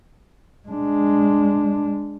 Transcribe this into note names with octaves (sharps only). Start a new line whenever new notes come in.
G#3 D4